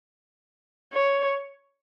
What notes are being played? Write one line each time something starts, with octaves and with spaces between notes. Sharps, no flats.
C#5